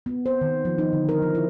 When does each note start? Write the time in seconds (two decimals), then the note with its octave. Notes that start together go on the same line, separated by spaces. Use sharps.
0.06 B3
0.26 C5
0.41 D#3
0.65 F3
0.78 D#4
0.93 D3
1.09 A#4
1.22 F3
1.35 E4